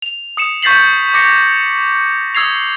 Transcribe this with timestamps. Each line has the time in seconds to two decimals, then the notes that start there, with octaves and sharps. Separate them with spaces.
0.02 F7
0.37 D#6 C#7 E7
0.63 C#6 G6 A6 B6 C7 F#7
1.14 D6 A#6 C#7
2.35 D#6 E6 G#6 C7 F7